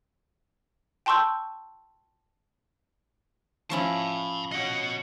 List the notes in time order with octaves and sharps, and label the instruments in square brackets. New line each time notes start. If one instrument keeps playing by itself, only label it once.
[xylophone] G5 A5 C6 C#6 E6 G6
[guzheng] F3 C#4 E4 [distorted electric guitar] A5 B5
[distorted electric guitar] F#4 D#5 [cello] C#5 F#5